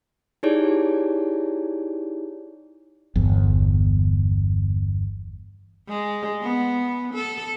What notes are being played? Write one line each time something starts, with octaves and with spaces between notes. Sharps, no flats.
D#4 E4 G4 G#4 C#5 D5
G1 E2
G#3
B3
A4